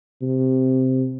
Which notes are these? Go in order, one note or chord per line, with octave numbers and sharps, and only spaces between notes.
C3